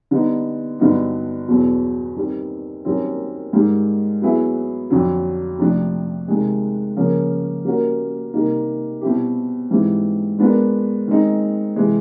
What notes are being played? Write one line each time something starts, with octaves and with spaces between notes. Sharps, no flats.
D3 G3 B3 D#4
G2 D3 F#3 B3 D#4
E2 B2 F#3 B3
D#3 G3 C4
F#2 D#3 G3 C4
G#2 D#3 G3
F#3 B3 E4 G#4
F2 D3 F#3
C3 F3 A3 D4
C3 D#3 G#3
C#3 F3 A#3 C#4
G3 A#3 C#4 F#4 A#4
C3 D#3 G3 A#3 D#4
B2 G3 C4 E4 G4
G#2 E3 G3 C4
G#3 B3 D4 F4 A#4
D#3 G#3 C4 D#4
C3 E3 G#3